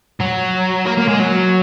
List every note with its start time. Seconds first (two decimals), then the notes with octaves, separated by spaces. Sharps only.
0.21 F#3
0.86 A#3
0.98 A#3
1.08 G#3
1.19 F#3